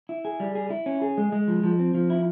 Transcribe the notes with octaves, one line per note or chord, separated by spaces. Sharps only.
E4
G#4
G3
G#4
E4
C#4
G#4
G#3
G#3
F3
F3
C4
F3
E4